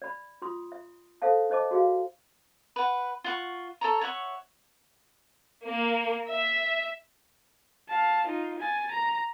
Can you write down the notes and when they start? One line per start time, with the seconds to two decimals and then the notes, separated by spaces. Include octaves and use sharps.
0.02 D5 B5
0.42 F4 C6 D#6
0.72 E5
1.22 A4 C5 E5 F5 A5
1.50 E4 C5 D#5 A5 D6
1.71 F#4 G#4 F5
2.76 B4 F#5
3.24 F4 F#5 C#6
3.81 A4 C#5 A#5
4.01 C#5 E5 F#5 C#6
5.67 A#3
6.29 E5
7.88 F5 A5
8.26 D#4 F4
8.59 G#5 A6
8.90 A#5